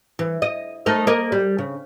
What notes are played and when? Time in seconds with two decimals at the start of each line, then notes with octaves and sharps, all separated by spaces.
0.19 E3
0.42 D#5
0.86 A3 D#4 A#4
1.07 A#3 A#4 D#5
1.32 G3
1.58 C#3